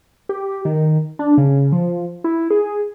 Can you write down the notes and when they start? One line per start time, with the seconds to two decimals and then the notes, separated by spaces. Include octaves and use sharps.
0.29 G4
0.65 D#3
1.19 D4
1.38 C#3
1.72 F3
2.24 E4
2.50 G#4